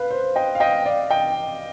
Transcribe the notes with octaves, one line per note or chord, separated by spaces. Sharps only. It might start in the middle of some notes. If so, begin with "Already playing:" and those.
Already playing: B4 F5
C5
D#5 G5
F5
D#5 G5
D5 F5
D#5 G5